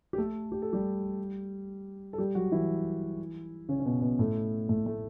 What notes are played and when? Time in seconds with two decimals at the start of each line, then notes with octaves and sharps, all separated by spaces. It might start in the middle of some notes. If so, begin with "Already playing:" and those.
0.13 G4
0.18 A3 A4
0.52 G4
0.62 A4
0.73 G3 G4
2.13 A4
2.18 G3 G4
2.35 F#3 F#4
2.52 E3 E4
3.69 C#3 C#4
3.80 C#4
3.85 B2 B3
4.02 B2 B3
4.19 A2 A3
4.69 A2 A3
4.86 A3